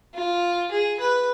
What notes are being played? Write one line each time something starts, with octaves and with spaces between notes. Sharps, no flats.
F4
G#4
B4